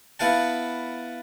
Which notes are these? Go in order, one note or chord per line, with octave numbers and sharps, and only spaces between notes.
B3 E4 F5 F#5 A5